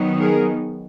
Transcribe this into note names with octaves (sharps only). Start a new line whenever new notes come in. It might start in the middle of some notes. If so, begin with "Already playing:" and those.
Already playing: D#3 F#3 B3 D#4
G#4 A#4